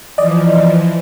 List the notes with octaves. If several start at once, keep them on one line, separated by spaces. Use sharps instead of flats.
E3 F3 D5 D#5